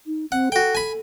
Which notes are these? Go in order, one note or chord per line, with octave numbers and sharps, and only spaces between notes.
D#4
C4 F#5
F#4 A4 G5
G#5 B5